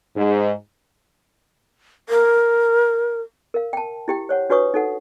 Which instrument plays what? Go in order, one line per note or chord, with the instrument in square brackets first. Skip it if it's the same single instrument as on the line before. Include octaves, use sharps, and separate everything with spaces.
[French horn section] G#2
[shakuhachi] A#4
[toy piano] A#4 F5
G5 A5
E4 G4 G5
C5 C#5 F#5
D4 F#4 B4 C#5 C#6 D#6
D#4 A4 F#5